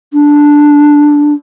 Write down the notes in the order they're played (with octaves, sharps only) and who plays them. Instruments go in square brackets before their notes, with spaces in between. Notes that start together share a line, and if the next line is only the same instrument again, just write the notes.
[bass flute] D4